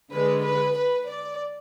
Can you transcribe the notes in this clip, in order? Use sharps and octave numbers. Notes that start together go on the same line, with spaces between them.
D3 G#3 B4
B4
B4
D5